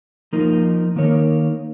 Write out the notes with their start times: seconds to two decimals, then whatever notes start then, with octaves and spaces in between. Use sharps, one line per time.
0.33 F3 A#3 D#4 A#4
0.96 D#3 A#3 D#4 A#4 C#5